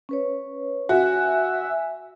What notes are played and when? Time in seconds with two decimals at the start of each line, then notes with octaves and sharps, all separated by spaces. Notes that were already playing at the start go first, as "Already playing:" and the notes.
0.09 C#4 B4 C#5
0.89 F#4 E5 G#5